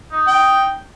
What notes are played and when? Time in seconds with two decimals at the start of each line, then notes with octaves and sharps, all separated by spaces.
0.12 D#4
0.27 G5